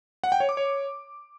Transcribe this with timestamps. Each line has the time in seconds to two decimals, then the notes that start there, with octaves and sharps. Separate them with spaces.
0.24 F#5
0.32 G5
0.40 C#5
0.49 D6
0.57 C#5